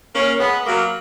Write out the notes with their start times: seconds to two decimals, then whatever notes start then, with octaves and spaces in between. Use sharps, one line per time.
0.14 A#3 C#4
0.40 G#3 B3
0.66 F#3 A#3